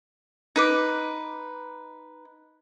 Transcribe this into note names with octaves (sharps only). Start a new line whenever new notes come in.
D#4 B4 D6